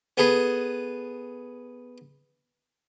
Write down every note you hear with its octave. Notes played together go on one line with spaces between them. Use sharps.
B3 G#4 A4 B4